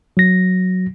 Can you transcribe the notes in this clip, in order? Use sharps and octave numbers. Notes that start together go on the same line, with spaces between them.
F#3 A#6